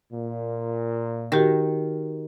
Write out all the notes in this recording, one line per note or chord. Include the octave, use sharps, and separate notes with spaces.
A#2
D#3 F#4 G4 A#4